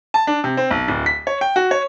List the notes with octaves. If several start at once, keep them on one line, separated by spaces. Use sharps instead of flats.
A5
D4
C3
C4
B1
D1
B6
C#5
G5
F#4
C#5